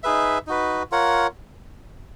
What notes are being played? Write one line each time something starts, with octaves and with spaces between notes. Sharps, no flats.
D#4 G#4 B4 E5
D#4 F#4 B4
F4 A#4 C#5 F#5